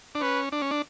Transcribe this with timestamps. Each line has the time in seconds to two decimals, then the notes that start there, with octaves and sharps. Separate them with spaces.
0.15 D4
0.21 C#4 B4
0.52 D4
0.62 C#4
0.71 D4